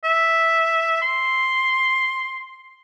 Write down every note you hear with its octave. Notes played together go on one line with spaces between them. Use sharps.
E5
C6